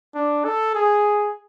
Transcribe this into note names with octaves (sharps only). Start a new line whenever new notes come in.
D4
A4
G#4